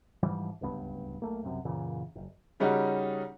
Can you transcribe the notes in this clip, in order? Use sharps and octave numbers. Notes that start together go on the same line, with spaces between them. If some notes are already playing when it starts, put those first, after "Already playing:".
G#2 E3 F3 G3
D1 C#2 G2 B3
B1 A3 A#3
F#1 C2 F#2 C3
F#2 A#2 C#3 E3
F#1
C#3 G3 C#4 D#4 F#4